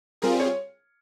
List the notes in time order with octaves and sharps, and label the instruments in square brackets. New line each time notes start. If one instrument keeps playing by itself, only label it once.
[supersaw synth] G3 C4 F4 G#4 [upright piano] A#4
[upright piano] C#5